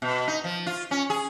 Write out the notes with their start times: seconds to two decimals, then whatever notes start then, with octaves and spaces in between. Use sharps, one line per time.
0.02 B2
0.28 D#4
0.44 F3
0.66 F4
0.91 C#4
1.10 G#4